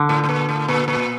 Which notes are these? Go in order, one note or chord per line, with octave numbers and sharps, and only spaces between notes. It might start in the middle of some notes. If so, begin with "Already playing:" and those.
Already playing: D3
A2
A2
A#2
A2
A#2
A#2